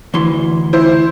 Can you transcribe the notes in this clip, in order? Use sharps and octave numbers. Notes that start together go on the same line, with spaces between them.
D2 E3 C6
E4 C5